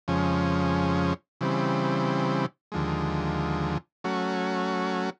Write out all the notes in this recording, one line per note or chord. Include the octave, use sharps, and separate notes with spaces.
F2 C#3 F3 G#3 C#4
C#3 E3 G3 C4
D#2 D3 F3 G#3
F#3 A3 C#4 F#4